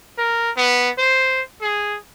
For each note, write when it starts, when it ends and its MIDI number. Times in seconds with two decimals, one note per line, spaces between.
0.18 0.51 70
0.57 0.90 59
0.98 1.43 72
1.61 1.98 68